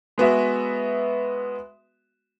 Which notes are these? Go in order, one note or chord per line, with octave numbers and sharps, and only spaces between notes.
G#3 B3 F#4 E5